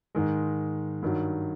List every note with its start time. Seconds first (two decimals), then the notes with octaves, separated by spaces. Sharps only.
0.15 G#2 D#3 G#3
1.02 G2 D#3 F#3